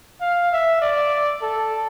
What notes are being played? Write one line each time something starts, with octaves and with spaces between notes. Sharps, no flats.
F5
E5
D5
A4